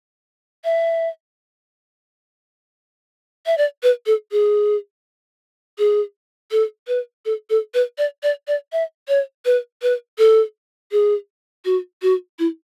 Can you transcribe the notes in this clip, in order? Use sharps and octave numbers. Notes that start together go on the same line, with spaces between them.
E5
E5
D5
B4
A4
G#4
G#4
A4
B4
A4
A4
B4
D5
D5
D5
E5
C#5
B4
B4
A4
G#4
F#4
F#4
E4